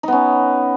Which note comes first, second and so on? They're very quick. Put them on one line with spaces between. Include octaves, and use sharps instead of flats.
D#4 B3 C#4